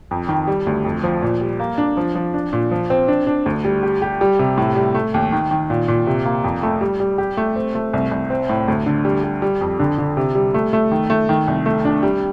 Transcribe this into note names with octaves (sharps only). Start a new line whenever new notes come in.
F2
D#3
G3
D2
F2
F3
A#2
G3
A#3
D4
F3
F3
D4
A#2
F3
C4
D4
D4
D2
G3
G4
G4
G3
C3
A2
G3
A3
D#2
D#3
D#3
A#2
A#2
C3
A#3
F2
A3
G3
G3
G4
A3
C4
A3
C2
C2
C4
A2
D2
D3
G3
G3
G3
F2
D3
D3
C3
G3
A3
A3
D#3
A3
D#3
C2
A3
D4
G3